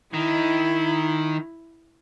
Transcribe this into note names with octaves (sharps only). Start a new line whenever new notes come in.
D#3 E4